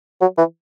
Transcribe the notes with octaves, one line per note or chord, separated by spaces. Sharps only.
F#3
E3